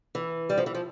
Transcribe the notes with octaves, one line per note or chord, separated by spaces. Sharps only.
E3
G3
F3
E3
F3